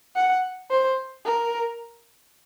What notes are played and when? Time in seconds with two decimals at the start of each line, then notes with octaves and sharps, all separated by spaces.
0.16 F#5
0.71 C5
1.26 A#4